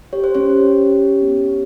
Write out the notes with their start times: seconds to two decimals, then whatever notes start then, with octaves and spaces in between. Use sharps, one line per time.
0.13 G4 C#5
0.24 C5
0.35 C#4 C#5
0.49 G4
0.86 G4
1.22 B3